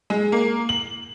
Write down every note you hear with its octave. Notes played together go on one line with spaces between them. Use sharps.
G#3
A#3
F#7